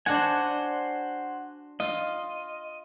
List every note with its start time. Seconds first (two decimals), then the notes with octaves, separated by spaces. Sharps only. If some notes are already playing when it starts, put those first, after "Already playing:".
0.06 D4 F#4 C5 F#5 G#5
1.80 F4 D#5